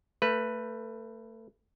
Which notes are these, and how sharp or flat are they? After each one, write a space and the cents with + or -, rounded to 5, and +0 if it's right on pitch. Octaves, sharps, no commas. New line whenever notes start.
A3 +25 B4 +0